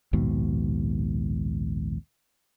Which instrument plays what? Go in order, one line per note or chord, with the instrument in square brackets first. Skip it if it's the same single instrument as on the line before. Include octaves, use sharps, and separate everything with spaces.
[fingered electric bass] A#1 D#2 G#2 B2